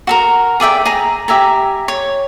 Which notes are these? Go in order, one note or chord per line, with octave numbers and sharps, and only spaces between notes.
F#4 A4 A#4
G#4 D5 E5 G5
G#4 A#5
G4 E5 G#5 A#5
C#5